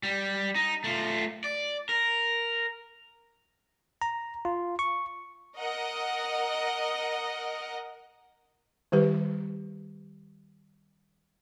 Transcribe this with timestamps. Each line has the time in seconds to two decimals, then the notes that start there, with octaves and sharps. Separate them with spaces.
0.03 G3
0.55 D#4
0.84 A3 F4
1.44 D5
1.89 A#4
4.02 A#5
4.45 F4
4.79 C#6
5.58 A#4 D#5 F#5
8.92 D#3 G3 G4 B4